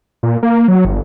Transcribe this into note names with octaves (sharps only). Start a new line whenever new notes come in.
A#2
A#3
F#3
G1